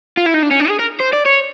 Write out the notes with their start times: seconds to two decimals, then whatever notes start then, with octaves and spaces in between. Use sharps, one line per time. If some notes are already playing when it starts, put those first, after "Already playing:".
0.17 F4
0.26 E4
0.34 D#4
0.43 D4
0.51 C#4
0.60 D4
0.69 G#4
0.79 A#4
1.00 C5
1.13 D5
1.25 C#5